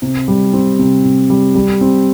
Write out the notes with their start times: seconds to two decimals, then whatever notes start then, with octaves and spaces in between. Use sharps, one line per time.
0.02 C3
0.28 G3
0.53 C4
0.79 C3
1.04 C3
1.30 G3
1.55 G3
1.81 C4